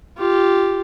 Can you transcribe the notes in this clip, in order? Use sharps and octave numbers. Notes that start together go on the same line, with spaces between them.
F4 G4